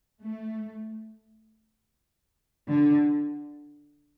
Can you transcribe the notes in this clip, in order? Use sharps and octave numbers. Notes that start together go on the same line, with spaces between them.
A3
D3